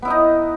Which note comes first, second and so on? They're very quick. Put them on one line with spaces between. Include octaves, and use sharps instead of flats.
B3 E4 D#5 D#4